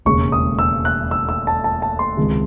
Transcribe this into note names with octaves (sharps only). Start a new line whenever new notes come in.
E1 D#2 C#3 G#3 C#6
D#6
E6
F#6
E6
E6
A5
A5
A5
C6
C#2 C3 D#3 G#3